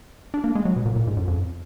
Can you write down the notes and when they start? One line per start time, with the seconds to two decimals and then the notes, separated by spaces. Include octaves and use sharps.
0.34 D4
0.44 A#3
0.55 G#3
0.65 F#3
0.76 B2
0.86 A#2
0.96 A#2
1.07 G#2
1.17 F#2
1.28 F2